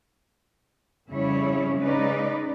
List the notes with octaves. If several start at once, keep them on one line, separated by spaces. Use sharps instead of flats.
F2 C#3 G3 E4 C#5
C#3 G#3 D#4 B4 D5